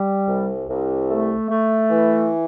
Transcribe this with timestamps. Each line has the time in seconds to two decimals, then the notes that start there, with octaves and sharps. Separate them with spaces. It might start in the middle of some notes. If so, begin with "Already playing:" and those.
Already playing: G3
0.27 C2
0.68 C2
1.08 A3
1.50 A3
1.90 E3